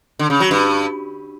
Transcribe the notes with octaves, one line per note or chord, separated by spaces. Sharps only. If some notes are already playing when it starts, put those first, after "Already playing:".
D3
C#3
F#3
G2